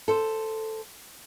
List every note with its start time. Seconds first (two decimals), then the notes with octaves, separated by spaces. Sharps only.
0.08 A4 C5